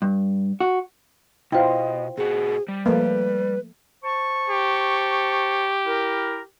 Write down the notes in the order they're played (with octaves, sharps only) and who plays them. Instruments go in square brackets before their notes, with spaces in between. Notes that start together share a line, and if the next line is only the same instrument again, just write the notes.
[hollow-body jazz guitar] G2
F#4
[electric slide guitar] B2 [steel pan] E4 F4 [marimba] C5 G5 [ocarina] D#5
[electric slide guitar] A#2 F#4 [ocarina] G#4
[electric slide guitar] G3
[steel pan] F3 A3 A#3 [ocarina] B4
[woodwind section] C5 A5 C#6
[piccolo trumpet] G4
[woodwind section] E4 A#4